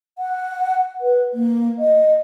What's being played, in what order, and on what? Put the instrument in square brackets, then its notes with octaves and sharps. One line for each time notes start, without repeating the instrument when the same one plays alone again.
[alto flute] F#5
B4
A#3
D#5